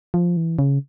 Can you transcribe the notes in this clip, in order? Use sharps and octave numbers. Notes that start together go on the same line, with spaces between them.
F3
E3
C#3